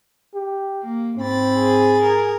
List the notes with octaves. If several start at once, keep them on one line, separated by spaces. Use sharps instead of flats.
G4
A#3
G#2 C4 B5 A6
G#4
A#4